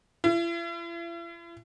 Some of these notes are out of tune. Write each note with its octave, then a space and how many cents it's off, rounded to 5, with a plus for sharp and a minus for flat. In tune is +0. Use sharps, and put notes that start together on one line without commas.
E4 +45